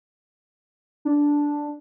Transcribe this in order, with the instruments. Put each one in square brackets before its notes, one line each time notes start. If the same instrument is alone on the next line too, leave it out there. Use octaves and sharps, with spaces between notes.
[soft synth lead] D4